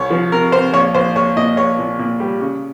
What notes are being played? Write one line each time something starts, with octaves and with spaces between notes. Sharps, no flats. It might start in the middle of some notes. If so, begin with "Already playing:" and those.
Already playing: C2 C#5
F3
C3 A#4
C3 C5
A#1 C#5
A#1 C5
A#1 C#5
A#2 D#5
A#1 C#5
A#2
A#2
G3
C#3